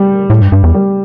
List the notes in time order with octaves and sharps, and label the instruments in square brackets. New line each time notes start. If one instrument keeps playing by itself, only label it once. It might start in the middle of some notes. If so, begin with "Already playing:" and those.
Already playing: [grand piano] G3
[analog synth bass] A2
G2
G2
E2
[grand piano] G3